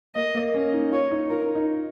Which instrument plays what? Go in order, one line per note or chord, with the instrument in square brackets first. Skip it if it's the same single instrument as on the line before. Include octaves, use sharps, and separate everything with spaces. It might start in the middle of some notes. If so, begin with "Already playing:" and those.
[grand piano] A#3 [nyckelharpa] D#5
[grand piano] A#3
C#4
D#4
[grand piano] F4 [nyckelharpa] C#5
[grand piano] D#4
[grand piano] F4 [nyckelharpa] A#4
[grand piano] D#4
D#4